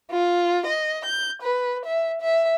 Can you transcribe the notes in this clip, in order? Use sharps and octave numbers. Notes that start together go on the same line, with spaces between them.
F4
D#5
G6
B4
E5
E5